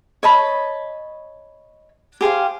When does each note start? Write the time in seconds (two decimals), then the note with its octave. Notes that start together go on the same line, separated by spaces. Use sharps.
0.23 C#5 D#5 A5 B5
2.21 G4 G#4 C5 F5